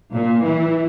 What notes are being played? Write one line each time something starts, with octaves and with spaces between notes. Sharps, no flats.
A#2
E3